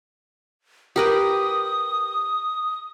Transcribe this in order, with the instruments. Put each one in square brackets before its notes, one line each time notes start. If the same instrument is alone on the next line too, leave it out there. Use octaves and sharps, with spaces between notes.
[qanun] G4 A#4 B4 [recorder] D#6